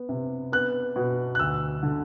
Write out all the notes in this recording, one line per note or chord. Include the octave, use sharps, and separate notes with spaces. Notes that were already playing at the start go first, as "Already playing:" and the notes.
Already playing: B3
C3
B3 F#6
B2
F#6
D2 E6
D3